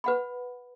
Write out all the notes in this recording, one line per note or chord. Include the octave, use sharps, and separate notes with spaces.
B4 F#5 B5